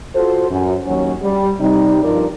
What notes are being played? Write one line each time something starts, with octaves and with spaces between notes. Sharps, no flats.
F4 F#4 A4 C5
F#2
D#2 F#3 C#4 F#4 C#5
G3
C3 G3 D#4
G2 F3 D#4 A#4 D5